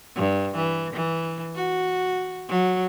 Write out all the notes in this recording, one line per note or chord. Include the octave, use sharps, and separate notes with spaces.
G2
E3
E3
F#4
F#3